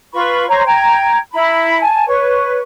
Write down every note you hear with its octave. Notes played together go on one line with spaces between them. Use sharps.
F4 B4 B5 C#6
C5 C#5 A#5 C#6
G5 A#5 G#6
E4 A#5 B5
G#5 A5
B4 C#5 C#6